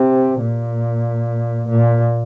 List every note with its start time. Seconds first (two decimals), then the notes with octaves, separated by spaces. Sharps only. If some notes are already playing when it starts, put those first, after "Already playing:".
Already playing: C3
0.41 A#2
1.69 A#2